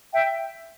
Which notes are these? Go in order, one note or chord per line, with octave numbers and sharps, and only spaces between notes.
E5 G5